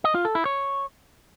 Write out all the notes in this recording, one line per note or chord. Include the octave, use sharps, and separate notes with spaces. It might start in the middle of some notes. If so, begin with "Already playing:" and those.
D#5
F4
A4
E4
C#5